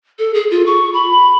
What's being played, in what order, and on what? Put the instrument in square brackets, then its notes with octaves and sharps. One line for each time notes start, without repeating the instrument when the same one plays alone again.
[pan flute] A4
G#4
F4
C#6
B5